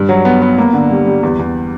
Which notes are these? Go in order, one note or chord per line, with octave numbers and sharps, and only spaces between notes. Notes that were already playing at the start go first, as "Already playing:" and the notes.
Already playing: G2
F#3
B3
B3
A#3
D3
G3
G3
E2
E2